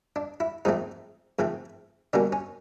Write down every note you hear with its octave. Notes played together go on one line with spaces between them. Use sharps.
D4
E4
G#2 F3 A3 C4 D#4
G#2 F3 A3 C4
B2 G3 A#3 C#4 D4
C#4